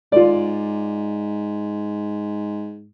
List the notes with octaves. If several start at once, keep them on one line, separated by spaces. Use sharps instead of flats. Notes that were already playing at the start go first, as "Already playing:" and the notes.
G#2 F4 D5